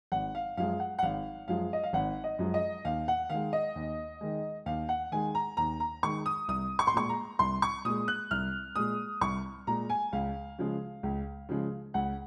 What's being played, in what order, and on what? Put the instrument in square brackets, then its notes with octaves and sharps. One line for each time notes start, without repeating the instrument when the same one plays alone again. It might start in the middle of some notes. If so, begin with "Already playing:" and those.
[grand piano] G#1 F#5
F5
F#2 F3 G#3 F5
F#5
F#5
G#1 F5
F#2 F3 G#3 F5
D#5
F5
G#1 F#5
D#5
F#2 F3 G#3
D#5
D#2 F5
F#5
D#3 G#3 F5
D#5
D#2
D#3 G#3
D#2 F5
F#5
D#3 G#3 G#5
A#5
D#2 A#5
A#5
D#3 G#3 C#6
D#6
C2 D#6
C#6
C6
A#2 G#3 C#6
A#5
C2 C6
C#6
A#2 G#3 D#6
F#6
C2 F6
A#2 G#3 D#6
C2 C#6
A#2 G#3 A#5
G#5
C#2 F5
C#3 F3 G#3
C#2
C#3 F3 G#3
C#2 F#5